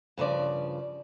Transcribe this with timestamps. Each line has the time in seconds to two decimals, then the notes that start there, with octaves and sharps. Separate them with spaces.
0.18 G2 C#3 F3 D5